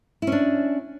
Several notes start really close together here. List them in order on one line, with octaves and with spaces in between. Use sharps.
E4 C#4 D4